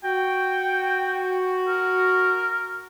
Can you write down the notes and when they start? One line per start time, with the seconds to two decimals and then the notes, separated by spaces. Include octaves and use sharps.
0.04 F#4 G5
1.68 A#4